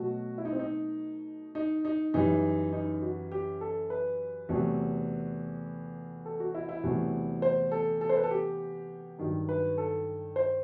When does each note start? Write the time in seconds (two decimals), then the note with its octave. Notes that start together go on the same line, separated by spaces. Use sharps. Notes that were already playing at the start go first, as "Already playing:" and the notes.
Already playing: B2 F#3 A3 F#4
0.38 E4
0.45 D#4
0.52 C4
0.59 D#4
1.55 D#4
1.85 D#4
2.14 F#2 E3 G3 D#4
2.73 D#4
3.02 F#4
3.32 G4
3.61 A4
3.90 B4
4.49 E2 C3 F#3 A3
6.26 A4
6.40 F#4
6.54 E4
6.69 E4
6.84 E2 C3 F#3 A3
7.42 C5
7.72 A4
8.01 A4
8.09 C5
8.17 B4
8.24 A4
8.31 G4
9.19 G2 D#3 F#3
9.49 B4
9.78 A4
10.36 C5